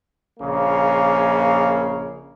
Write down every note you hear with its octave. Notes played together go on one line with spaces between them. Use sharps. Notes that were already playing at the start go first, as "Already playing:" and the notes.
A#1 C#3 A#3